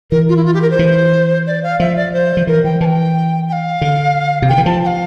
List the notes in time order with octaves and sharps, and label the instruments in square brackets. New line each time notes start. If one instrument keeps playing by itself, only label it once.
[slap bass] E3 [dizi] A#4
[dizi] F4
E4
F4
G4
A#4
C5
[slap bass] E3
[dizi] D5
F5
[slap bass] F3 [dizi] E5
[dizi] D5
C5
[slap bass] F3
[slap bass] E3 [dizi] A#4
[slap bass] E3 [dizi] G5
[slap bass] E3 [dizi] A5
[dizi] G5
G5
F5
[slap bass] D3
C3
[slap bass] D3 [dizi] G5
[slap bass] E3
[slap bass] F3 [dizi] A5
[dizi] G5
F5